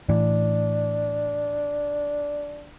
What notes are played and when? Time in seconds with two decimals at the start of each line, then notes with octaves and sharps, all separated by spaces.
0.09 A2 E3 D4